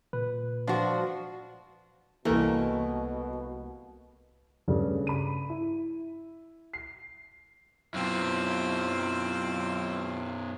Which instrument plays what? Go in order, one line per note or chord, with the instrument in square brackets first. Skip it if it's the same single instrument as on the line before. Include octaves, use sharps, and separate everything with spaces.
[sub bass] A#2 [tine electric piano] B4
[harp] F3 [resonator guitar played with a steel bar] D4 F#4
[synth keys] C2 A#3 [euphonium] B2 [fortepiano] E3 A#4 [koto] A3
[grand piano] G2 C#3 A3 D5
B5 D#7
E4
C7
[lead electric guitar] F#2 B2 [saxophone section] C4 E4 F4